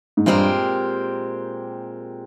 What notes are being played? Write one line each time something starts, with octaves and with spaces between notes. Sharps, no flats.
G#2
G2 A#2 G#3 C4 G4 A#4